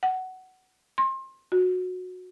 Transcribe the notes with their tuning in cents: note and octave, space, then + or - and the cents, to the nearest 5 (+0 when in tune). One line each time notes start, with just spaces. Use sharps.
F#5 +15
C6 +30
F#4 -15